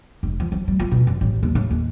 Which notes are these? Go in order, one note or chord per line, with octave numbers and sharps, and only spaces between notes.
F1
F3
F3
G3
F4
B2
F#2
A1
D#2
A2
D#2